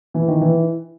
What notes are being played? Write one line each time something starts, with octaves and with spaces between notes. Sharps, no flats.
E3
D#3
E3